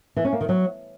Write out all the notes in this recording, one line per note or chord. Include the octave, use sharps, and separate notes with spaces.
E3
C#4
A#3
D#3
F#3